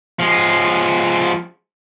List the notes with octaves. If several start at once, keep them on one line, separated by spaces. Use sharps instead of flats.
F3 G#3